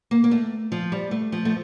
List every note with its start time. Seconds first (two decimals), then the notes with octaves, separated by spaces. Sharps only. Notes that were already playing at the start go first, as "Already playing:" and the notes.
0.11 A#3
0.24 A#3
0.31 A3
0.72 F3
0.92 G3
1.11 A3
1.32 F3
1.45 A3